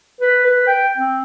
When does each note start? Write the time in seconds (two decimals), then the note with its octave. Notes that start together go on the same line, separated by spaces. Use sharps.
0.21 B4
0.46 B4
0.67 G5
0.97 C4